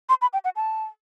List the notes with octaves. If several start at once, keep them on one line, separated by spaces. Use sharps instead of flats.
C6
B5
G5
F#5
A5